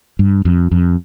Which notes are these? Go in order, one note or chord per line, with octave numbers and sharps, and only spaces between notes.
G2
F2
F2